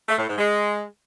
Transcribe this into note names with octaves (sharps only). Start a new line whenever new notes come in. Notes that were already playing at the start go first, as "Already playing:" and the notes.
A3
A2
G#2
G#3